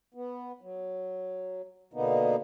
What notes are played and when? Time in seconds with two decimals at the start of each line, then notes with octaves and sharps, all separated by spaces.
0.14 B3
0.61 F#3
1.93 B2 D3 A#3 B3 D#4